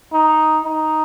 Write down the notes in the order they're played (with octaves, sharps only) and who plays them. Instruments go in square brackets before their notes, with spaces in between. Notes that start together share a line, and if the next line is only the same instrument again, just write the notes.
[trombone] D#4
D#4